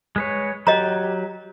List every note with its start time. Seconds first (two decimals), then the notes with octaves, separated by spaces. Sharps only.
0.16 G#3 B4 C#5
0.67 F#3 G4 D#5 A#5